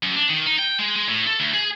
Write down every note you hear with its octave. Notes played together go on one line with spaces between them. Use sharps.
F#2
D4
D#3
D#4
G5
G#3
G#3
A2
A4
D2
G#4